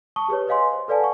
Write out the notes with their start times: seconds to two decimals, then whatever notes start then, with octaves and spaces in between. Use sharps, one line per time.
0.16 A5 C#6 D#6 G7
0.28 G4 G#4 B4 C#5
0.47 B4 C#5 D#5 F5 G#5 C6
0.73 C5
0.88 A4 B4 D5 F5 G#5 A5
1.00 F#5 C#6